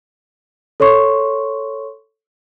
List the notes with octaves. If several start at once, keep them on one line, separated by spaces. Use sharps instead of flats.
A4 C#5 C6 C#6